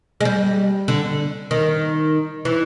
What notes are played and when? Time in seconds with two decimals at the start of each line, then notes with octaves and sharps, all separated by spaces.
0.21 G#3
0.25 G3
0.88 D3
1.51 D#3
2.45 E3